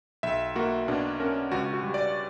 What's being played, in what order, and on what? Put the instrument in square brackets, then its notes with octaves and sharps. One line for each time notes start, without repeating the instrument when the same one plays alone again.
[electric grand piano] B1 E5
A#3 F#4
B2 D4
C#4 A#4
C#2 F#4
F#4
G3
D5